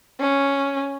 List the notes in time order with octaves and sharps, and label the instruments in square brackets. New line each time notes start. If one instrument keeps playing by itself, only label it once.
[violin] C#4